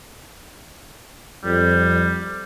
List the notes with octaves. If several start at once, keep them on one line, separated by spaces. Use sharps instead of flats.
F2 G3